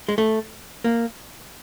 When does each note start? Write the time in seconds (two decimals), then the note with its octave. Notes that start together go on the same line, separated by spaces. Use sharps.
0.09 G#3
0.18 A3
0.84 A#3